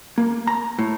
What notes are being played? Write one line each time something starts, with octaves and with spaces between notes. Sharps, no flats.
A#3
A#5
A2